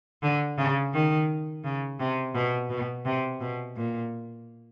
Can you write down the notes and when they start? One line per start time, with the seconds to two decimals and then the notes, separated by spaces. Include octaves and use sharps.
0.23 D3
0.58 C#3
0.93 D#3
1.64 C#3
2.00 C3
2.35 B2
2.70 B2
3.06 C3
3.41 B2
3.76 A#2